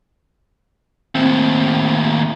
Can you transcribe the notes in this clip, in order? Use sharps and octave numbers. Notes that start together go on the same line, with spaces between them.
D#2 A2 C4